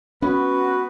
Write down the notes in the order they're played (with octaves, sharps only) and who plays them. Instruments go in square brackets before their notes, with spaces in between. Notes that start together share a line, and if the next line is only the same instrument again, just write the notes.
[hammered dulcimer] B3 [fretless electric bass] C#4 [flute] F#4 [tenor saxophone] B4